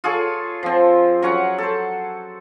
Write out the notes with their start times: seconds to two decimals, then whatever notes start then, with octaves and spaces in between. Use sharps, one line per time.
0.04 F4 G#4 A4 C#5
0.63 F3 C4
1.22 F#3 C#4 C#5 F#5
1.58 A4 C5